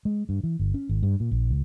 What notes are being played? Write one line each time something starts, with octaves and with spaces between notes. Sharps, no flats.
G#3
G2
E3
G1
C#4
G#1
G2
A#2
A#1
C#2